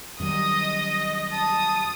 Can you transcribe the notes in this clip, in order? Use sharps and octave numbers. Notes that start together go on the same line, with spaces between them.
F#2 D#3 G3 D#5 D#6
A5 D#6